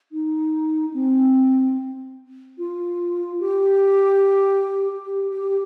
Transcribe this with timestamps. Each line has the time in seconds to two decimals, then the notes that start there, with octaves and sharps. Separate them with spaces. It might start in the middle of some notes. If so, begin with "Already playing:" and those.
0.12 D#4
0.94 C4
2.58 F4
3.40 G4
5.04 G4
5.31 G4